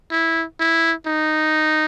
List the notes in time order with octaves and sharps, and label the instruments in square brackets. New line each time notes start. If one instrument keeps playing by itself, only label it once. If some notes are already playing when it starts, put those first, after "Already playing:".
[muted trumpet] E4
E4
D#4